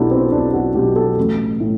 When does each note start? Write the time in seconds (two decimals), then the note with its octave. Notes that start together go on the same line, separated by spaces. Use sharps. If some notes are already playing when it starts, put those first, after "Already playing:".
Already playing: B1 B2 F#3 D4 E4 G4 A4
0.11 C4
0.32 B1 D4
0.53 F#4
0.75 B2 F#3 G4
0.96 A4
1.18 A1
1.60 A2